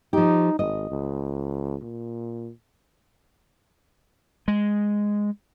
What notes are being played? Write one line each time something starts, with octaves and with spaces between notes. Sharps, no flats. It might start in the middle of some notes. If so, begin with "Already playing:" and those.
F3 D#4 G4
G#1 D#5
C#2
A#2
G#3